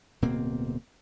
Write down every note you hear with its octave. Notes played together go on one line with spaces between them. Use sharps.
D1 B2 A#3 C4